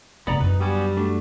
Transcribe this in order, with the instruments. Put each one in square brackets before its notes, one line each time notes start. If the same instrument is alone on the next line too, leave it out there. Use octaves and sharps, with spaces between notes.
[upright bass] A2 C#3 [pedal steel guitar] B3 D5 A#5
[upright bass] F#2 D3 [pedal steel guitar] D#4 B4
[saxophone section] G3 [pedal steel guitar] B3 F#4 G#5
[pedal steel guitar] A3 D4 F#4